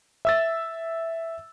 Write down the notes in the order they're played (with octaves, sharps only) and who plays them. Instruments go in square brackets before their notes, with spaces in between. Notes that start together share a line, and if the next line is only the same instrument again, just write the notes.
[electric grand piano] E5 E6 A6